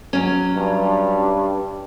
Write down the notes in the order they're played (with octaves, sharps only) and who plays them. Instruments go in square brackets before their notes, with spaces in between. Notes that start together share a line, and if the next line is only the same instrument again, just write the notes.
[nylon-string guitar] F#3 C#4
[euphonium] G2